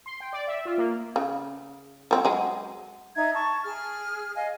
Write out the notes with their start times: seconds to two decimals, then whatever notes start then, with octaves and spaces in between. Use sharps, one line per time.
0.06 C6
0.20 G5
0.33 D5
0.48 E5
0.65 F4
0.78 A#3
1.16 C#3
2.11 F#3 C4
2.25 F#3 G#3
3.16 D#4 E5 A#5 G#6
3.35 A5 C#6
3.64 G#4 F6
4.36 D#5 F5 G#5